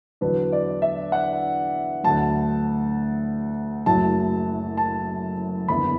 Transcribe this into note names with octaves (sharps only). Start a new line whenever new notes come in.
E2 D3 F#3 D4 B4
D5
E5
F#5
D2 D3 F#3 A5
F#1 F#2 F#3 A3 E4 A5
A5
F#1 E2 D3 B3 E4 B5